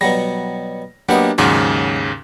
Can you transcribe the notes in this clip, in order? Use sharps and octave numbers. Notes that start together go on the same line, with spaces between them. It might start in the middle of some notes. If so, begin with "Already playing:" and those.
B2 F#3 G3 A#6
F#3 A#3 B3 D4 G4 D#5
D#2 G#2 C#3 F#3 C#4 D5